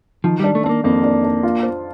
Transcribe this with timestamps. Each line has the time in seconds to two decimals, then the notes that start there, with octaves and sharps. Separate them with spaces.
0.24 D#3 F3
0.40 G3 D4
0.55 A3
0.64 C4 D4
0.69 A#3
0.84 F2 A#3
1.04 D4
1.24 D4
1.43 F4
1.63 C5